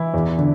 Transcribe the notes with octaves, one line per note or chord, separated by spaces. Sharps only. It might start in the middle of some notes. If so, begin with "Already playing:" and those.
Already playing: E3 E4
E2
D3